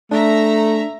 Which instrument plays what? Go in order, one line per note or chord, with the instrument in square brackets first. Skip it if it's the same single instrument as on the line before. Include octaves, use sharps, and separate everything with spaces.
[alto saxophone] A3 [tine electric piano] D4 [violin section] E5 A#5